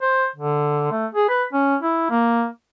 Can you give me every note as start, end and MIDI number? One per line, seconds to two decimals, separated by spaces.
0.02 0.27 72
0.36 0.87 50
0.92 1.07 57
1.15 1.28 68
1.29 1.44 71
1.53 1.76 61
1.82 2.09 64
2.10 2.46 58